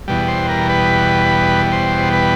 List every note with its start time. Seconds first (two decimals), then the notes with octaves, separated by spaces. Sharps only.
0.08 E2 B2 G3
0.28 C5
0.49 A#4
0.70 B4
1.72 C5
2.13 B4